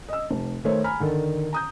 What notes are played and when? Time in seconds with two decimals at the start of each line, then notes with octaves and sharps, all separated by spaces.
0.09 D#5 E6
0.31 F1
0.64 D#3 A3 C5 C#5
0.84 G#5 A#5 B5 F6
1.00 D3 D#3 A4
1.53 A#5 D#6 G6